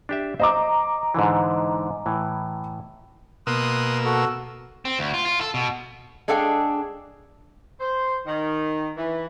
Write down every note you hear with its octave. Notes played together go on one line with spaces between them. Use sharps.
D4 G4 E5
C5 D#5 A#5 D6
G#2 D3 E3
A2 E3
B2 A#3 C6 D#6 E6 F#6
F#4 A4
C4
D2
F4
F4
A4
B2
G#3 D4 G#4 A4 F5 G5
C5
D#3
E3